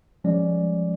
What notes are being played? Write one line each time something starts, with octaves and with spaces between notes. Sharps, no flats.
F3 G3 G#3 C#4 D5